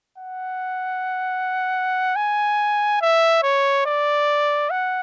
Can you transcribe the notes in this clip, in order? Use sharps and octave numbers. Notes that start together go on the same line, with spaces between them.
F#5
G#5
E5
C#5
D5
F#5